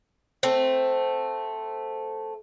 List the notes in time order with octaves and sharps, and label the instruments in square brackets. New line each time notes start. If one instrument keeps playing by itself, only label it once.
[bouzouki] A3 C4